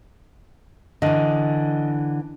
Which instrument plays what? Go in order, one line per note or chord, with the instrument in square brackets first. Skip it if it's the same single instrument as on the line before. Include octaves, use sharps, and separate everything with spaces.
[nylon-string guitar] D3 E3 [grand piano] D#5